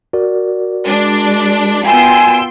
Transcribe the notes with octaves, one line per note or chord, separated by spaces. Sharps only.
F#4 A#4 D5
G#3 D4
B3 F4 G5 G#5 C6 E6